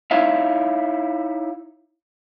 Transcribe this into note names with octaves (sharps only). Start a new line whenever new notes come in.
D#4 E4 C#5 E5 F5